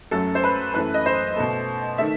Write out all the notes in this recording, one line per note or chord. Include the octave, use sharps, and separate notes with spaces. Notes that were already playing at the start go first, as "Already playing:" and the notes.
F#2 F#3 A3 A4
C5
B4
F#2 E3 A3 B4
D#5
C5
B2 A3
D#3 A3 E5